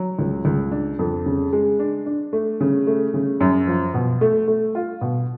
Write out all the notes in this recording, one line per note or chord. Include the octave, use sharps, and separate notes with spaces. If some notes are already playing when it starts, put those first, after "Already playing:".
Already playing: F#3
C#2
C#2
D4
F2
C#3
G#3
D4
D4
A3
C#3
A3
C#3
F#2
F3
B2
A3
A3
F4
B2